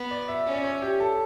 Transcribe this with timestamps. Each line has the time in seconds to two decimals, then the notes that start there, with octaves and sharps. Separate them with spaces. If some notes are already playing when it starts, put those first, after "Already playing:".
Already playing: B3
0.11 D5
0.28 E5
0.46 C#4
0.53 D5
0.64 C#5
0.82 G4
1.00 A4